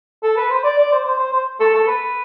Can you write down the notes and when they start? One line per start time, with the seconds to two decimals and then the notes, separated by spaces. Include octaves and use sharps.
0.23 A4
0.37 B4
0.51 C5
0.64 D5
0.78 D5
0.92 C5
1.04 C5
1.19 C5
1.33 C5
1.60 A4
1.73 A4
1.87 B4